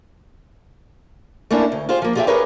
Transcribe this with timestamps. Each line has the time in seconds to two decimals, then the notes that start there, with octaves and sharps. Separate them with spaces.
1.51 A3 A#3 C#4 D4 E4
1.72 D2
1.89 F4 G4 G#4 C5
2.02 F3 A#3
2.15 F4 G4 G#4 D#5 E5 G5
2.27 G4 G#4 A#4 B4 C#5